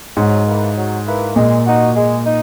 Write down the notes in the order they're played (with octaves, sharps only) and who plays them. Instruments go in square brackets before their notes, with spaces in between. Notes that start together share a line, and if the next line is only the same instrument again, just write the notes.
[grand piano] G#2 [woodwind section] F#3
[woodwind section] A#3 E4 B4
F#3
A#3 E4 B4
[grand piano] A#2 [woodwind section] G#3
[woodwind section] D#4 F#4
G#3
D#4